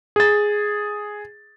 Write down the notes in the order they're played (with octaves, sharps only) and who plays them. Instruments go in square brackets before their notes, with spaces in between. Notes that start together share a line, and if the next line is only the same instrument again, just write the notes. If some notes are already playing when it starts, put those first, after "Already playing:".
[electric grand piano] G#4 A6